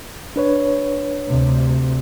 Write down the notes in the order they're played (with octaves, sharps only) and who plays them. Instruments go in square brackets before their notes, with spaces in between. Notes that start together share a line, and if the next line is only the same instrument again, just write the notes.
[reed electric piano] D4 B4 C#5
[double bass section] D2 C3